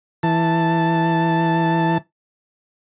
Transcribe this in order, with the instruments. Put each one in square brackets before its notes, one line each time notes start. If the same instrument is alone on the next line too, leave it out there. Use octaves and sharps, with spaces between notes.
[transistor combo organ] E3 A5